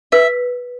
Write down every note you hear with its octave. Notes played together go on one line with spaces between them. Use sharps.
B4 E5